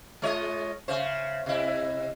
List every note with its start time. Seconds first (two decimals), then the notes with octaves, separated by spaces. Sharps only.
0.22 G#3 F4 C#5 D#5
0.88 C#3 C5 E5
1.46 C3 E4 D#5